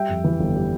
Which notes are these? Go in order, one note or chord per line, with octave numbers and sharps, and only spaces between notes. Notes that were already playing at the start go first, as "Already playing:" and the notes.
Already playing: G3 E5 G5
F2
E3
G1
G3